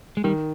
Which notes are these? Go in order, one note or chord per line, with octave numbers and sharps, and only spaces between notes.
G#3
D#3 G3